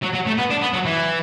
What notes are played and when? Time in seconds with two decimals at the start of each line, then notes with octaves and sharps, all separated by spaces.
0.02 F#3
0.13 F#3
0.26 A3
0.38 B3
0.50 D4
0.62 B3
0.73 F#3
0.85 E3